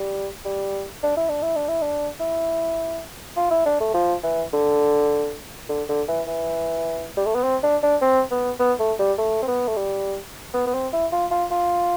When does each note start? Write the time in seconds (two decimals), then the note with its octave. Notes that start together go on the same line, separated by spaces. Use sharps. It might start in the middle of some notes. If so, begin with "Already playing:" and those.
Already playing: G3
0.45 G3
1.03 D4
1.17 E4
1.29 D4
1.42 E4
1.56 D4
1.68 E4
1.82 D4
2.20 E4
3.37 F4
3.51 E4
3.66 D4
3.80 A3
3.94 F3
4.23 E3
4.53 D3
5.69 D3
5.89 D3
6.08 E3
6.27 E3
7.17 G3
7.26 A3
7.35 B3
7.44 C4
7.63 D4
7.83 D4
8.02 C4
8.31 B3
8.60 B3
8.80 A3
8.99 G3
9.18 A3
9.43 C4
9.48 B3
9.68 A3
9.77 G3
10.54 B3
10.67 B3
10.74 C4
10.93 E4
11.12 F4
11.31 F4
11.51 F4